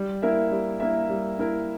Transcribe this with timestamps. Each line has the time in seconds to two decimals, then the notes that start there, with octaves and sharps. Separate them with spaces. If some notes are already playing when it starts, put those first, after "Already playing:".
Already playing: G3
0.22 A#3 E4 A#4 E5
0.52 G3
0.80 A#3 E4 A#4 E5
1.10 G3
1.39 A#3 E4 A#4 E5